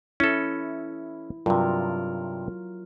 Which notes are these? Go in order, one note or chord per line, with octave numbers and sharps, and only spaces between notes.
C#4 E4 A4
G2 C3 F#3 F4 A#4